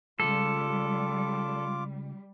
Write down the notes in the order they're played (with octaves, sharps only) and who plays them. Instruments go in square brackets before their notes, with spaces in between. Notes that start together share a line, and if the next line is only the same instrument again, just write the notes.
[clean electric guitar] C#3 F3 G#3 [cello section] G3 [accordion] F4 D6 [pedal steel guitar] A4